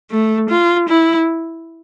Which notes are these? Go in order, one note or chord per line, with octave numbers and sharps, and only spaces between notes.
A3
F4
E4